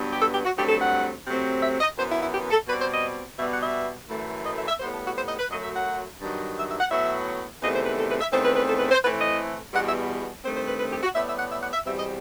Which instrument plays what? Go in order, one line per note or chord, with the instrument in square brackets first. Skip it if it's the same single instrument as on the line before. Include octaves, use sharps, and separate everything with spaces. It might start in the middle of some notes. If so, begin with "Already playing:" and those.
Already playing: [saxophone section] G2 F#3 B3
G4
A4
G4
F#4
G2 F#3 A3 C4 G4
A4
F#5
C3 F#3 A3 C4
E5
D#5
F#2 E3 B3 C5
E4
E4
G4
A4
B2 G3 C4 B4
C5
D#5
B2 G3 B3 E5
F#5
E5
F#2 E3 A3
D#5
E5
E5
A2 G3 B3 C5
A4
F#4
C5
D#5
B4
F#2 F#3 A3 D#5
E5
F#5
G2 D#3 F#3
E5
E5
F#5
A2 F#3 B3 E5
E2 C3 D#3 A3 D#5
C5
B4
A4
B4
E5
E2 D#3 A3 C4 C5
B4
B4
A4
B4
C5
A2 E3 A3 C4 B4
D#5
E2 B2 G3 F#5
E5
G2 D#3 A3 C4 C5
C5
B4
B4
G4
F#4
A2 G3 B3 E5
E5
F#5
E5
F#5
E5
E2 B2 G3 C4 E5
D#5